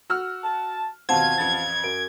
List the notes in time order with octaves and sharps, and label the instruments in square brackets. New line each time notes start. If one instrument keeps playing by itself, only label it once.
[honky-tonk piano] F#4 E6 F6
[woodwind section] A5
[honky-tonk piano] D#2 B2 C4 [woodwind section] F3 F5 [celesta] F#5 A5 [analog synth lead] G#6
[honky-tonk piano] A1 F2 A6
[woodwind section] F#2 [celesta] D7